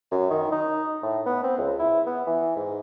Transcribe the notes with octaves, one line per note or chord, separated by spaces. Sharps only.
F#2
D#3
D#4
A2
B3
C4
C#2
E4
B3
E3
G#2